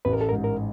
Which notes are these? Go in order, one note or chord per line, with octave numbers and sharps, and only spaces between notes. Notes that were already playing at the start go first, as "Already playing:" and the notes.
A1 B4
A#4
A4
G#2 A#4
A#4